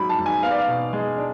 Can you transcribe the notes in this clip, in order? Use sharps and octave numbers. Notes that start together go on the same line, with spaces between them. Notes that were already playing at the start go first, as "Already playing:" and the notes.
Already playing: G#2 F#3 B5
A5
G#2
G#5
B3 F5
D5
F5
B2
G#3
D4